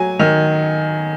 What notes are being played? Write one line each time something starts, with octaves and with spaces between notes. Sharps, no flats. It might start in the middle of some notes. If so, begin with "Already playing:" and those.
Already playing: F#3 G#5
D#3